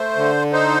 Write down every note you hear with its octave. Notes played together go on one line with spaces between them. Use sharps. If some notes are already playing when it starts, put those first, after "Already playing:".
Already playing: A3 C5
D3
D#4 C5